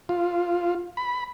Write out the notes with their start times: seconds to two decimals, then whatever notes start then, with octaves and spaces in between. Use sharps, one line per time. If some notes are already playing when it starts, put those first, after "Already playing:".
0.09 F4
0.97 B5